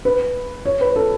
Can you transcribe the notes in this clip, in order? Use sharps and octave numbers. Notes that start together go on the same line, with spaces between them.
B4
C#5
B4
A4